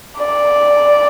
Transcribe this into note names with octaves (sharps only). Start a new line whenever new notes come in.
D5